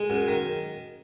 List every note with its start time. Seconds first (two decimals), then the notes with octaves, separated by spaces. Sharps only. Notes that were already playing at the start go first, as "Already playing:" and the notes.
Already playing: G#3
0.10 F#2
0.28 D#3